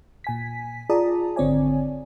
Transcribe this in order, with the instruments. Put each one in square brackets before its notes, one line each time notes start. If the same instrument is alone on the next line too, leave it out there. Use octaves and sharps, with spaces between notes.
[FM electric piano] A#2 G#5 B6
F4 G#4 D5 A5 A#5 D#6
G#1 D3 C4 C#5 D5 G#5